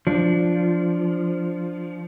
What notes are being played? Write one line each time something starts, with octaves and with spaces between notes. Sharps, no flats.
F3 D4